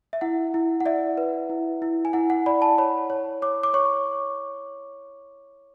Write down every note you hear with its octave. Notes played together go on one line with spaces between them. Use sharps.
E5
E4 F#5
E4
F#5
D5 E5
B4
E4
E4
G#5
E4 F#5
F#5
D5 B5
A5
C#5 B5
C#5
C#5 D6
D6
C#5 C#6